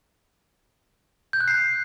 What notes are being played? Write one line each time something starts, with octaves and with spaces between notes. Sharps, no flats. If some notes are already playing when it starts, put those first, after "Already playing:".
G6
F#6
C7